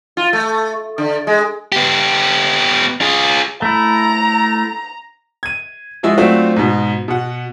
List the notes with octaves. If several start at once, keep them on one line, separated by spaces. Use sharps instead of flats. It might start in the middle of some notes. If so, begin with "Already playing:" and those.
F4
A3
D3
G#3
B3 G4
F4 G#4
A3 E4 A#5
G#6 D#7
F3 G#3 E4 F#4 G#4
F#3 A3 C4 D4 F4 F#4
G#2 B2
B2 F#5